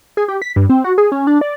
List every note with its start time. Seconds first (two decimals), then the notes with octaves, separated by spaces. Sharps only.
0.17 G#4
0.28 G4
0.42 B6
0.56 G2
0.70 C4
0.84 F#4
0.98 G#4
1.12 C#4
1.27 D4
1.41 D5